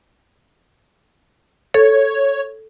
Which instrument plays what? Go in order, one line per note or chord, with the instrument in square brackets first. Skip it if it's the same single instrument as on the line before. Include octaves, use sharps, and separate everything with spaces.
[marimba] A4 [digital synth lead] C#5